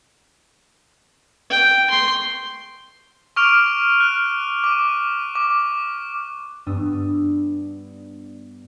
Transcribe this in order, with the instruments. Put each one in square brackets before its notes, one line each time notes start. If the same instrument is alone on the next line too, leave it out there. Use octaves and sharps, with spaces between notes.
[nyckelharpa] G5
C6
[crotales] C#6 D6 F6 D7 F7
F6 F#6
D6 D#7
D6
[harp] G2 B3 D4 D#6 E6